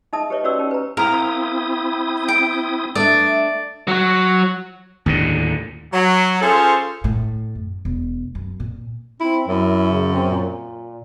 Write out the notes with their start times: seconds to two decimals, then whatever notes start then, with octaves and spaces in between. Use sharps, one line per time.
0.13 D#4 G#4 D#5 E5 A5 D#6
0.30 G4 B4 C#5 D#5 E5
0.44 C#4 F#4 B4 C#5 D5 E6
0.59 C#4 D#4 G4 C#5
0.71 B4 A#5
0.97 C4 E4 A#4 F5 D#6
2.28 G5
2.95 A3 D4 D5 E5 D#6
3.88 F#3 F#4
5.06 D#2 A2 D3
5.93 F#3
6.42 C#4 F4 G#4 A4 C5
7.04 A2
7.55 F#2
7.85 E1
8.35 F#2
8.60 A#2
9.20 C4 E4
9.48 F#2 E4
9.91 C#3
10.14 C4
10.29 A#2